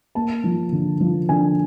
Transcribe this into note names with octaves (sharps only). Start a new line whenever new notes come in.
A#3 A5
F3
D3
F3
D3 G#5